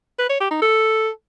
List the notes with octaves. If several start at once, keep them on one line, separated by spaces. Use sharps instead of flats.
B4
C#5
G4
D#4
A4